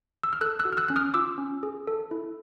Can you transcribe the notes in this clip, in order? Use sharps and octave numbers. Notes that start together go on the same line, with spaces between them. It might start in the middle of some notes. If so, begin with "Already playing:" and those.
E6
F6
A4 E6 F#6
E6 F#6
F#4
F6
E6 F#6
C#4 F#6
D#6 F6
F4 D6 E6
C#4
G#4
A4
E4